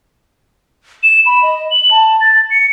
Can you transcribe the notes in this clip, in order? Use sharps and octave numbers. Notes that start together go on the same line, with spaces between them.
E7
B5
D#5
F#7
A5
A6
C#7